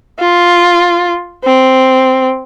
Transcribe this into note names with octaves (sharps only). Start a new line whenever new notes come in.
F4
C4